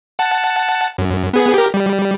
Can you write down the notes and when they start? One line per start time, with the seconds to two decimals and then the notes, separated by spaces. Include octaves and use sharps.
0.19 F#5 A5
0.98 F#2
1.33 B3 G#4
1.54 G4 A#4
1.74 G3